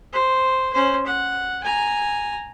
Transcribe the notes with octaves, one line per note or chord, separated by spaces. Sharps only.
C5
C#4 C5
F#5
G#5 A#5